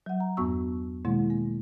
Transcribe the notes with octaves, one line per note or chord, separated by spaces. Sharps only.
F#3 F#5
A#5
E2 G2 B3 F#4 C#6 E6
B2 D#3 G#3 A#3 E4
A#3